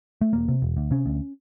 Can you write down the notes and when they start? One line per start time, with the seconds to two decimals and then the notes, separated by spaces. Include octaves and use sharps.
0.21 A3
0.33 E1 A#3
0.48 C3
0.62 E1
0.77 D2
0.91 C3 C#4
1.06 D2